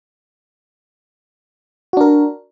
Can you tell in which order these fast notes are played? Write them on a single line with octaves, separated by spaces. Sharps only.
F#4 D4 A#4